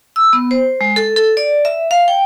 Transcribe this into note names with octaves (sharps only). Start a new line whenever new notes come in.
E6
B3
C5
G#3
A4
A4
D5
E5
F5
G5